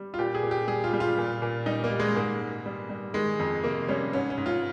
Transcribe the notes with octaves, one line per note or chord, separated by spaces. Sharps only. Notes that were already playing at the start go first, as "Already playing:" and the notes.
Already playing: G3
F4
A#2 G4
G#4
A#2
G4
G3 G#4
F4
G3
F4
A#2
A#2
G3 D#4
A#3
G3
G#3
G#2 A#3
G#2
G3
G3
D#3 G#3
F2
C3 A#3
G3 C#4
G#2 C#4
C#4
G#2
F4